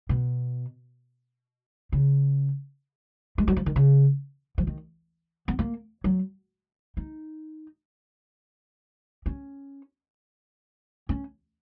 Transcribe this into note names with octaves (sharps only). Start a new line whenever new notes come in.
B2
C#3
G#3
F#3
F3
D#3
C#3
F3
D#3
B3
A#3
F#3
D#4
C#4
C#4